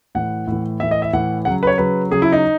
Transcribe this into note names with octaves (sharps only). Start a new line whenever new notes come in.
A2 E3 F#5
A2 E3
A2 E3 E5
D#5
E5
A2 E3 F#5
C#3 F#3 F#5
B4
C#5
C#3 F#3 B4
C#3 F#3 G#4
E4
D#4